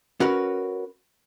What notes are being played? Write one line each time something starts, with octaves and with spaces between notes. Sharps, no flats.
C#4 F#4 A#4 B4